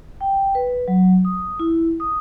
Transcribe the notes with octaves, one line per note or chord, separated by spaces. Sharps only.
G5
B4
F#3
D#6
E4
D#6